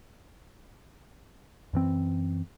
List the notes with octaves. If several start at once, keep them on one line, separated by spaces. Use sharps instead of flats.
F#2 E3 C4